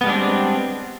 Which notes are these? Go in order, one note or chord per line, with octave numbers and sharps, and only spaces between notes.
G3 G#3 B3 C4 D4